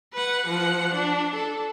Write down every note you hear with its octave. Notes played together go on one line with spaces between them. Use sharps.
B4 F#5
F3 F#5
D4
A4